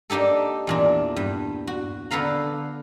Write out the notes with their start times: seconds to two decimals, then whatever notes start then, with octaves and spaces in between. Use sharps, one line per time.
0.10 A#3 D4 D#4 G4 A4
0.67 E2 A#2 D4
1.16 G2
1.67 F#4
2.11 D3 B3 A4 B4 F5 A#5